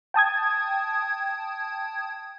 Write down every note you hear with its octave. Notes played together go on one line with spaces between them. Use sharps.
G5 A5 D#6 G#6